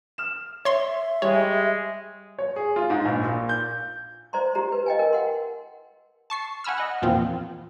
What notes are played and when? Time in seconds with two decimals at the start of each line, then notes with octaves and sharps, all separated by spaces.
0.18 F6 E7
0.65 C#5 E5 C6
1.22 G3 G#3 C#5
2.39 C#5
2.56 G#4
2.76 F4
2.90 G#2
3.05 A#1
3.24 A#2
3.49 G6
4.33 C5 D5 A#5 C6
4.55 F4 G4 A#5
4.72 B4
4.86 D#5 G5 G#5
4.99 A#4
5.13 F#5 C6
6.30 A5 C#6 C7
6.64 F#5 G#5 B5 E6 F6
6.78 D#5 F#5
7.02 E2 A#2 F3 C4 F4